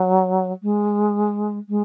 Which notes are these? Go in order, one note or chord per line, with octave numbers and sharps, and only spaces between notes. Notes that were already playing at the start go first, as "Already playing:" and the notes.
Already playing: F#3
G#3
G#3